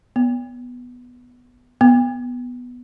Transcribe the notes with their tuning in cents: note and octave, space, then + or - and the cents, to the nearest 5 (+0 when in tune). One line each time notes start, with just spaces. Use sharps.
B3 -5
B3 -5